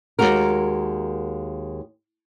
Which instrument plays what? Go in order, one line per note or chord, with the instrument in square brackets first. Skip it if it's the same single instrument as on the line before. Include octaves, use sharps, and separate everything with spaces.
[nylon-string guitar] D#2 G#2 G#3 F#4 A#4